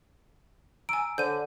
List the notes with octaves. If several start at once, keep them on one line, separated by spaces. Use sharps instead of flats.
G#5 A#5 E6 D7
D3 C5 C#5 F#5 G6 D#7